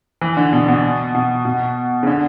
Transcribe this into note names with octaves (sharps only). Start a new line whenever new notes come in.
E3
D3
B2
B2
B2
B2
C#3
D3